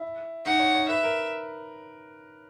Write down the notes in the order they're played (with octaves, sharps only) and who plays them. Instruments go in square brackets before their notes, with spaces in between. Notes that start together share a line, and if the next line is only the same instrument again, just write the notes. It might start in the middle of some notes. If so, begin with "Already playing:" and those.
Already playing: [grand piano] E4
[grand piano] D#4 [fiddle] F#5
[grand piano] C#5
C#5
[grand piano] B4 [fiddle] E5
[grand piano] A#4